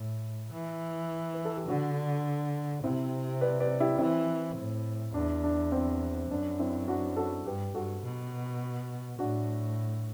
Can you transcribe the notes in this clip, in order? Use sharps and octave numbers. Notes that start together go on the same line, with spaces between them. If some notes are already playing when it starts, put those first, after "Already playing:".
Already playing: A2
E3
B4
A4
G4
D3 D4 F#4
C3 C4 E4
B4 D5
B4 D5
E4 G4
E3 C4 E4
A2
E2 D4
D4
C4
F#2 D4
C4 E4
D4 F#4
F#4 A4
G2 G4 B4
G2 F#4 A4
B2
A2 D4 F#4